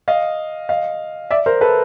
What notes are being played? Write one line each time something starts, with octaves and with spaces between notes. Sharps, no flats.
D#5 F5
D#5 F5
D5 E5
A#4 C5
A4 B4